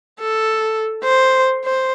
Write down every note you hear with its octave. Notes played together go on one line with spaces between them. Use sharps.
A4
C5
C5